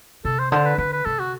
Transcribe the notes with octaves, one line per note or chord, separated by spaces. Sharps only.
C3 A4
C5
D3 C5
B4
D3 B4
B4
C3 A4
F#4